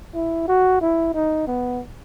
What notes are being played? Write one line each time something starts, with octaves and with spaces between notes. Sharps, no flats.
E4
F#4
E4
D#4
B3